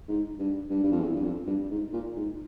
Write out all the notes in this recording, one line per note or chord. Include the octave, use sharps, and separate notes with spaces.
G#2
G2
G2
G2
F2
E2
G2
F2
G2
G#2
A#2
G#2